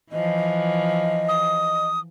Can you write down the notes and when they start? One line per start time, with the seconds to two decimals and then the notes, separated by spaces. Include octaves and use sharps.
0.12 E3 F3 D#5
1.29 D#6